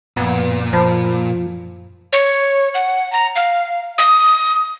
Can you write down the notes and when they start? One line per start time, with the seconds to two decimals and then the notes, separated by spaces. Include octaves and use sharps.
0.17 F#2 A#2 F3 B3
0.73 F3 C5 A5 B5
2.13 C#5
2.75 F#5
3.12 A#5
3.36 F5
3.98 D#6